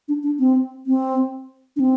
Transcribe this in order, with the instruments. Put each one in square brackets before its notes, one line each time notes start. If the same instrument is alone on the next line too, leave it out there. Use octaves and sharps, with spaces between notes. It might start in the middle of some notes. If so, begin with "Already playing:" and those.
[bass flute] D4
D4
C4
C4
D4
C4